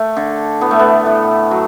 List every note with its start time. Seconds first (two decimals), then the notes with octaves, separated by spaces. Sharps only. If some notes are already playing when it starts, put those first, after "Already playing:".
Already playing: A3
0.17 D3
0.61 A2 B3
0.71 A3
0.79 B3
1.06 A2
1.51 F#3